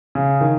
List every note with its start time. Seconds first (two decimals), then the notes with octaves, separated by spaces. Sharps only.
0.15 C#3
0.41 D#3